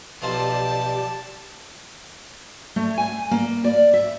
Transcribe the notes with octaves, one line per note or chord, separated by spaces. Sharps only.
B1 F3 G4 C5 D5 A5
A3
G#5
A#3
D5
E5